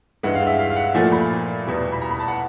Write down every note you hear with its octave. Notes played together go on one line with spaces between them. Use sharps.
G2 E3 G#3 F#5
F5
E5
F5
F5
F#5
A#2 F3 A3 G#5
B5
E2 B2 G3
B5
A#5
B5
A5
F#5